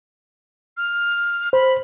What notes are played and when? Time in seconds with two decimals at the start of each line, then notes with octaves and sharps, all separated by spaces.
0.77 F6
1.53 C5 B5